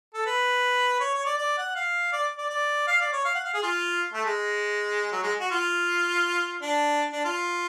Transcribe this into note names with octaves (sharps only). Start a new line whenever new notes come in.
A4
B4
C#5
C#5
D5
D5
F#5
F5
D5
D5
D5
F5
D5
C#5
F5
F#5
F5
G#4
F4
A3
G#3
F#3
G#3
F#4
F4
D4
D4
F4